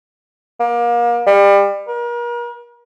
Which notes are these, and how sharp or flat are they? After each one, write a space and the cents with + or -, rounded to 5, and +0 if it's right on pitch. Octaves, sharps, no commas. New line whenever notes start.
A#3 +30
G3 +30
A#4 +40